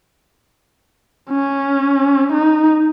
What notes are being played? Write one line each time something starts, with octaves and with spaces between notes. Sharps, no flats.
C#4
D#4